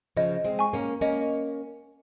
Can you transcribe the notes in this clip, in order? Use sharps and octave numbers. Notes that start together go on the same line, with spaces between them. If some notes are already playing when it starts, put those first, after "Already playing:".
C#3 F3 D#5
G#3 C4
G#5 C#6
A#3 C#4
A#3 C#4 D#5